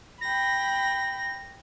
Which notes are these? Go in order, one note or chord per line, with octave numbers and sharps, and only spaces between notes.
G5 B5 A#6